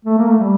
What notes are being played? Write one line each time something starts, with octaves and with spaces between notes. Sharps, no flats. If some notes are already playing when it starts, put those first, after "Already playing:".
A3
A#3
A3
G3